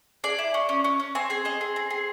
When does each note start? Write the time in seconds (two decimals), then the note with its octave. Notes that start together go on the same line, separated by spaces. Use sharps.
0.24 G#4 D5
0.39 E4
0.54 C#4
0.69 C#4
0.84 C#4
1.00 C#4
1.15 C4 G#5
1.30 G#4 G#5
1.45 C4 D#5
1.61 G#4
1.76 C4
1.90 G#4